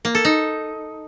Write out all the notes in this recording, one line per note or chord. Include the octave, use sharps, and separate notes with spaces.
A#3
A4
D#4